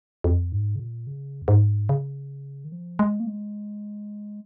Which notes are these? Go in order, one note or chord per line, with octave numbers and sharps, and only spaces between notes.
F2
G#2
C#3
A#2
C#3
F2
G#2
C#3
D#3
F3
G#3
A#3
G#3